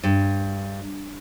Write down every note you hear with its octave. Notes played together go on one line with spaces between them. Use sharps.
G2